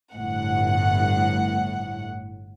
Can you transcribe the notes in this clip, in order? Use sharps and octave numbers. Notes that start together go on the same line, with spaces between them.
G1 A2 F#5